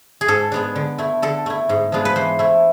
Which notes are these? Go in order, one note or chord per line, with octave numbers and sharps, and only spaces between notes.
G#4
G#2 A4
G#3 B3 D4
D3
A3 E4
D3 A4
A3 E4
G#2
F3 G#3 B3 D4
B4
E3 C5
A3 E4